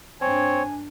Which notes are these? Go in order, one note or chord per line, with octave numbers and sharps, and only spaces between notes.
G2 C4 D4 C#5 G#5